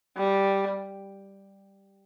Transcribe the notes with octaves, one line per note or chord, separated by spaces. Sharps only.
G3